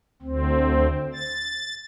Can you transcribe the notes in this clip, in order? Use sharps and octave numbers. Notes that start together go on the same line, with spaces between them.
D2 C4
A6